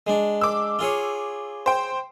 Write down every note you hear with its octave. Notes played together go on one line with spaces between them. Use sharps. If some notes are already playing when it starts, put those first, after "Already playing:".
G#3 D4
D6 E6
F4 G#4 C#5
C5 G5